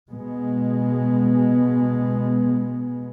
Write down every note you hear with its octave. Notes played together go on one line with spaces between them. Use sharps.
B2 G#3 B3